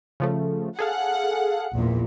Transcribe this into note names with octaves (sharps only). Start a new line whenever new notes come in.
C#3 F3 A3
G#4 A4 F5 F#5
A#1 E2 A#2